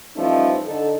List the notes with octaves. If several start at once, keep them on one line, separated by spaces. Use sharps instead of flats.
E3 F3 G3 A3 C#4 D#4
D3 D#4 A4